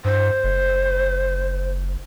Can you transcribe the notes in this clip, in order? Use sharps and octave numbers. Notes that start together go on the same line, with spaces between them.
G2 C5
F#1